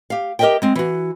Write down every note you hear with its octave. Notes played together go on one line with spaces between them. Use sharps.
G4 F5
G4 A#4 C5 D#5 E5 G5
G#3 C4
E3 F#4